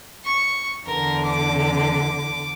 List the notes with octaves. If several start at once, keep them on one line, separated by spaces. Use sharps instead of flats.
C#6
E2 D3 A#4
D6